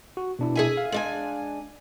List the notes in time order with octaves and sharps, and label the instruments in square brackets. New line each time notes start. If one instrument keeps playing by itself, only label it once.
[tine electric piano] F#4
B2 D4 E4
[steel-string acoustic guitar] G#4 E5 G#5
[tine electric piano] F5
[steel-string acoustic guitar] G#3 D4 G#5